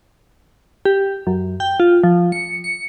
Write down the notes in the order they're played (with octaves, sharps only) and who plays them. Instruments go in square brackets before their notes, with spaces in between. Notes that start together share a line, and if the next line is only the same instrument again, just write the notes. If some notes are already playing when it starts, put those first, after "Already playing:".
[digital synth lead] G4
F#2
G5
F4
F3
C#7
C#7